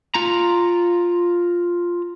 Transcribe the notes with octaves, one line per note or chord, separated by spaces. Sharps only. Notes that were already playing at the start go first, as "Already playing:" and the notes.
F4 A#5